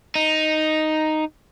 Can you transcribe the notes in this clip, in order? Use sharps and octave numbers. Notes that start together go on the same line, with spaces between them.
D#4